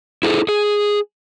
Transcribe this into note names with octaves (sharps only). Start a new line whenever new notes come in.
E4 G#4 A4
G#4